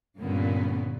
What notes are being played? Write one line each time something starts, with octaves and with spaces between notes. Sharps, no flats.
G2 A#2 D3 A#3 B3 C#4